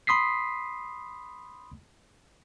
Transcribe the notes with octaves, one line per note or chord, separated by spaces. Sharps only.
B5 C6 D#6 B6 C7